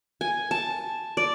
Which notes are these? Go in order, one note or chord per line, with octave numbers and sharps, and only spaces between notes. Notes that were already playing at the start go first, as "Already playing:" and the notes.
G#5
A5
D5